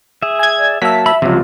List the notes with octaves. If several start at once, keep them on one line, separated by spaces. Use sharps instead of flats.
G#4 E5
G#5 G#6
D5
F#3 A#3 E5 A5 B6
E5 B5
C#2 C3 F3 F#3 F4